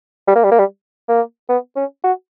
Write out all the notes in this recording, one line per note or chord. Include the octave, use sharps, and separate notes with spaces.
G3
A#3
G3
A#3
G3
A#3
B3
C#4
F#4